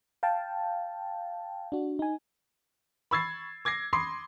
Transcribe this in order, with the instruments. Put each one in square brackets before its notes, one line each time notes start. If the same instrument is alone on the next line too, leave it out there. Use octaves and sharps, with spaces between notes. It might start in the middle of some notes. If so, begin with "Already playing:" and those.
[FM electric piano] F5 G5 A5
D4 F#4
D#4 G#5
[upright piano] B5 C#6 E6 G#6 A6 C7
D6 G#6 A#6 C7
B5 C6 D6 D#6 C7